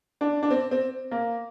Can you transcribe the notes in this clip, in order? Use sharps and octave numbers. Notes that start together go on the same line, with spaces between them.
D4
D4
C4
C4
A#3